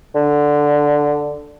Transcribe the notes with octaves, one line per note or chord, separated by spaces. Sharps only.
D3